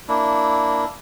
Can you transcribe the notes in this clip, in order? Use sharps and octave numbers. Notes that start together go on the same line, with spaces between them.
A#3 D4 E4